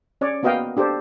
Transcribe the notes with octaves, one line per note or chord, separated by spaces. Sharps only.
C#4 C#5 D5
A#3 B3 F#4 D#5 F5 G5
D4 G4 A4 C5